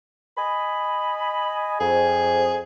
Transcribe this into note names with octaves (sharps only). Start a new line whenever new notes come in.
D#5 G#5 B5
F2 G#4